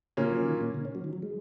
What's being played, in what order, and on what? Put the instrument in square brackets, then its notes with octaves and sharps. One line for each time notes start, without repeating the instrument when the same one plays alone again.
[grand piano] A#2 A#3 C#4 [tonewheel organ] C#3
[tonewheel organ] F#3
C#3
D#3
A#2
C#3
C#4
F#3
D#3
F#3
G#3